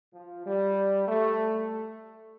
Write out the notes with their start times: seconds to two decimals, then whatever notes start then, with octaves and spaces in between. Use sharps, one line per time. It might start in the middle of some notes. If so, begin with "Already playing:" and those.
0.14 F3
0.46 G3
1.08 A3